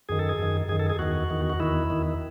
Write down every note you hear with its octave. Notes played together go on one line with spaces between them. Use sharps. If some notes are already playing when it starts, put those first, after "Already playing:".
F#2 D#3 G#4
A4
G#4
F#2 D#3
F#2 D#3 G#4
A4
G#4
E2 D#3 F#4
E2 D#3
F#4
E2 D#3 E4
E2 D#3